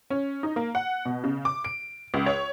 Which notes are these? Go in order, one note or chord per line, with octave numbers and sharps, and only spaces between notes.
C#4
D#4
A#3
F#5
B2
C#3
D6
D7
C#2
C#5